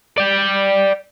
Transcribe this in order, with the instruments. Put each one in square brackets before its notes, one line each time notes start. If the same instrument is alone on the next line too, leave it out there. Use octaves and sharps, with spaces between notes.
[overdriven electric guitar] D5 G5